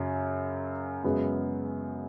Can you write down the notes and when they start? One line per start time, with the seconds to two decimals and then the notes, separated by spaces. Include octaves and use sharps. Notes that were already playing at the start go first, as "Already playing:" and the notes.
Already playing: F#2 C#3 F#3 C#4
1.04 F#2 C#3 G#3 B3 F#4